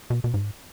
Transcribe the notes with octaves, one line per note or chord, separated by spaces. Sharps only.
B2
B2
G#2